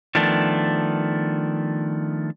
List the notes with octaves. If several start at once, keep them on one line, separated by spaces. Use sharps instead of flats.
D#3 F3 A3 B3 D4